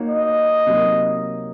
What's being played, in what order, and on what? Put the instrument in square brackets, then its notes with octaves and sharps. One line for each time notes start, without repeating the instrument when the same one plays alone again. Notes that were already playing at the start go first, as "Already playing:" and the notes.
Already playing: [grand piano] A#3 D#4 F#4 C#5
[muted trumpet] D#5
[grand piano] C3 F#3 A#3 D#4 A#4